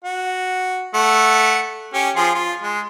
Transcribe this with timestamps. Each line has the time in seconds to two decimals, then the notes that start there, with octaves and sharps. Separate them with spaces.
0.04 F#4
0.94 A3 F#5
1.94 C#4 G4
2.16 F3 F4 G#4
2.34 F4
2.62 G#3